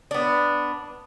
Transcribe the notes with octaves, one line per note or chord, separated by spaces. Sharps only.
B3 D4